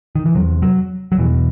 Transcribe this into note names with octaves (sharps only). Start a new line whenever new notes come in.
D#3
E3
E2 C3 F#3
F#3
F#3
E2 B2 E3